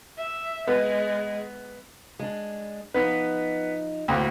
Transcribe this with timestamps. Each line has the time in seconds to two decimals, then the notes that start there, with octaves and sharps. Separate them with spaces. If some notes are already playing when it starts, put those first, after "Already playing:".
0.18 E5
0.68 G#3 B3
2.19 G#3 D4
2.94 F3 B3 D#4 B4
4.08 D2 A2 A#3 C#4 G5